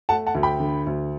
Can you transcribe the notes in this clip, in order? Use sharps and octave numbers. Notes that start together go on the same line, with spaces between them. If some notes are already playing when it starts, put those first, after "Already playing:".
A3 F#5 A5
F#5 A5
D2
G5 B5
D3
D2